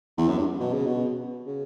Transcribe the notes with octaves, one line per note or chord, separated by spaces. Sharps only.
E2
F#2
G2
B2
C#3
B2
C#3